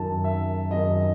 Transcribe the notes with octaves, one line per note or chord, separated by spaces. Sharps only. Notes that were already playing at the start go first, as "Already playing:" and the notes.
Already playing: F#2 D#3 A5
E5
F#2 D#3 D#5